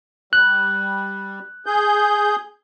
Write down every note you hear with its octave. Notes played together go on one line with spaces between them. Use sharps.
G3 F#6
G#4 G6